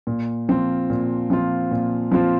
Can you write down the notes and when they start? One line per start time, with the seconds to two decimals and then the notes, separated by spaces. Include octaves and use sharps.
0.07 A#2
0.49 F3 C4 F4
0.90 A#2
1.30 F3 C4 F4
1.71 A#2
2.11 F3 C4 F4